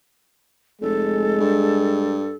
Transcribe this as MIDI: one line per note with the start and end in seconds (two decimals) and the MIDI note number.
0.81 1.36 29
0.81 2.21 56
0.81 2.36 69
1.40 2.34 43